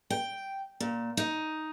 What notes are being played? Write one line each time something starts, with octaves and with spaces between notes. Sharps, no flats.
G5
A#2
D#4